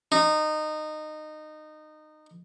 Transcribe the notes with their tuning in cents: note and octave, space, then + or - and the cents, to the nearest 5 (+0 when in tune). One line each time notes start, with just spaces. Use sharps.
D#4 -20